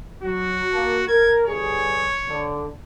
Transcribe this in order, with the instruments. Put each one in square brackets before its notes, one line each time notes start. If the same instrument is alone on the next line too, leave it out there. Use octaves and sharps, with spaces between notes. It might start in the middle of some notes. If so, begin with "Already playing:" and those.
[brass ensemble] F#3 [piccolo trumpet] F#4
[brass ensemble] A#3 A5
[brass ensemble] A#4 [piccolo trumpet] G#6
[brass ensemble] G1 G#4 [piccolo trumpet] C#5
[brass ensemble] D3